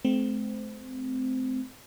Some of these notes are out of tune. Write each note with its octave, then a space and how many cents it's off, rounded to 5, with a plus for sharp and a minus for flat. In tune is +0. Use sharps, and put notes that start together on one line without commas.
A3 -45 C4 -20